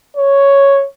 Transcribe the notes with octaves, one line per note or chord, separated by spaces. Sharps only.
C#5